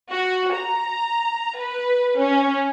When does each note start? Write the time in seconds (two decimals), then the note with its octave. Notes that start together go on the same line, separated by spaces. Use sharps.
0.12 F#4
0.56 A#5
1.58 B4
2.17 C#4